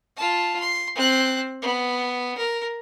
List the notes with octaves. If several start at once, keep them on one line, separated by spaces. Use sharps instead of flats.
F4 A5
C6
C4 F#6
B3
A#4